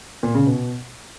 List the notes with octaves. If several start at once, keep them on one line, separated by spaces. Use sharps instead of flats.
A#2
C#3
B2